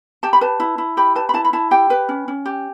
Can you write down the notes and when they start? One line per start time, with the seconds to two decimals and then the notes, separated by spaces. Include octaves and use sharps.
0.23 G4 A5
0.33 B5
0.41 B4 A5
0.60 E4
0.78 E4
0.97 G4 B5
1.16 B4 A5
1.29 B5
1.34 E4 A5
1.45 B5
1.53 E4 A5
1.71 G4 G5
1.90 B4
2.09 C#4
2.28 C#4
2.46 G4